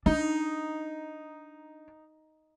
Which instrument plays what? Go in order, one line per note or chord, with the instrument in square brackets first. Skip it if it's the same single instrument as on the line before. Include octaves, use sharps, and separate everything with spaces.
[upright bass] D4 [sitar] D#4